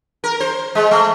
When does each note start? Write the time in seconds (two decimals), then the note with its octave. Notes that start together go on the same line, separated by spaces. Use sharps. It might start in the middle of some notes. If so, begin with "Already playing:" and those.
0.24 A#4
0.40 C5
0.75 G#3
0.91 A3